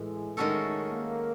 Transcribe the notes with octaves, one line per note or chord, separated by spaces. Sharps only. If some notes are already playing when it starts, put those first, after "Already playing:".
Already playing: A2 E3 G#3
D#3 G#3 A3 C#4 F#4 A4
A#3